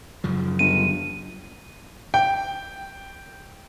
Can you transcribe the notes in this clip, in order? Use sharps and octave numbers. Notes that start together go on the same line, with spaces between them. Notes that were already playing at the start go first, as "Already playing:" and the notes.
F#2 C#3 F3
G1 D#7
G5